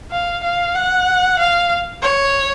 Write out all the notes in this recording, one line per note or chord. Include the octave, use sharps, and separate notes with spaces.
F5
F5
F#5
F5
C#5